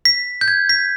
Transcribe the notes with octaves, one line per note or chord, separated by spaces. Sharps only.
B6
G6
G#6
B6